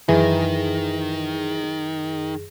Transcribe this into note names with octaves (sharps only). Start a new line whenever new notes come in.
F#2 D#3 E3 G#4 A#6